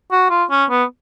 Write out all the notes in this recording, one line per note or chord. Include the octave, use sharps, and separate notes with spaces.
F#4
F4
C#4
B3